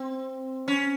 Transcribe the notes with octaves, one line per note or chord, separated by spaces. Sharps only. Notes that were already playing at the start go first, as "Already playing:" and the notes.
Already playing: C4
C#4